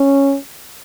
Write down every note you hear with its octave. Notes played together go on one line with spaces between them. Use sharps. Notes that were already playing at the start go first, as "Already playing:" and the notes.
Already playing: C#4